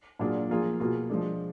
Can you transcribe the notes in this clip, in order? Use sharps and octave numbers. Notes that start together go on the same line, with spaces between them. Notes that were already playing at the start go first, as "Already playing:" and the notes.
A#2 F#3 D4 F4 G#4
F3 A#3 F4 G#4
B2 A#3 F4 G#4
F3 G#3 D4